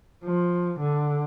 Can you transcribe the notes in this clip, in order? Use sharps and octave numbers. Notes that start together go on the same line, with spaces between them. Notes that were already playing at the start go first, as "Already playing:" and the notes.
F3
D3